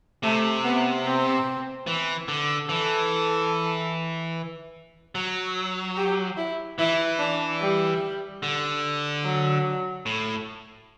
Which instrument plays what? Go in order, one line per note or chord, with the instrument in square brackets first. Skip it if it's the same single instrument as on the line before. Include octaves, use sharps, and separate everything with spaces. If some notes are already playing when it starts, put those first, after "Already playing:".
[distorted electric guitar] C3 [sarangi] A3
[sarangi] B3
C4
[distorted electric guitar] E3
D3
[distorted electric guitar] E3 [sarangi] A4
[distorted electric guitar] F#3
[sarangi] G4
E4
[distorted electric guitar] E3 [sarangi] E4
[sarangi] D4
G3
[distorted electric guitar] D3
[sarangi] F#3
[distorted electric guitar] A2